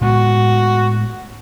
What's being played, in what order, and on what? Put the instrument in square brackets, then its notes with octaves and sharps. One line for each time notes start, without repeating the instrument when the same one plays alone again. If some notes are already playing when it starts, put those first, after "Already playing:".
[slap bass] A2 G#3 B3 [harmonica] F#4